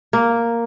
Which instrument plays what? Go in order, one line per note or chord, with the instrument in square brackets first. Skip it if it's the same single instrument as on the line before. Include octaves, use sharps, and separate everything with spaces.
[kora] A#3